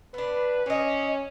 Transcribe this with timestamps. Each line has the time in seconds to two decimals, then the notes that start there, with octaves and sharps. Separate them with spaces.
0.14 B3 D4 B4
0.66 C#4 D4 D#5